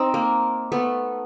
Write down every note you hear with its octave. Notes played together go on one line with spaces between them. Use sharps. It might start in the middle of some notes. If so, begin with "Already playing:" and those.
Already playing: C4 D#4
A#3
A3 B3